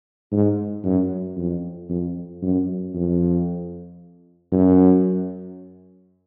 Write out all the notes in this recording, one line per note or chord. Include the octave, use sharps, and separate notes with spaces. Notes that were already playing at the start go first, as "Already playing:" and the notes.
G#2
F#2
F2
F2
F#2
F2
F#2